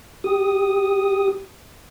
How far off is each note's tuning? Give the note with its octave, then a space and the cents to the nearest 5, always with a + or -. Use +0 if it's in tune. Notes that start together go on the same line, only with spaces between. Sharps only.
G4 +0 D#6 +0